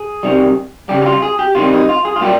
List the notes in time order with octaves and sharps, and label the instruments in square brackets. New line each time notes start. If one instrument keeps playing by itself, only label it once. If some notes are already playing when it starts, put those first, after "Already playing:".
Already playing: [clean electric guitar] G#4
C3 D#3 G3
C#3 G3 G4
G4
F4
G#4
G4
C3 D#3 G3 F4
D#4
F4
G#4
F4
A#2 G3 G4